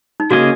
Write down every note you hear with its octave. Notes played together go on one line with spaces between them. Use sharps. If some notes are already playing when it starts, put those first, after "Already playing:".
D#4
C#3 A#3 C#4 F#4 G#4 D#5